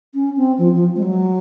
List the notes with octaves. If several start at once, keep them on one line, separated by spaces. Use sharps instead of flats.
C#4
C4
F3
F3
G#3
F#3